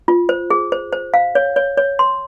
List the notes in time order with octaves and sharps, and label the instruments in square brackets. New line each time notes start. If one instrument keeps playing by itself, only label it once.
[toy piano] F4
C5
G#4
C5
C5
F5
C#5
C#5
C#5
C6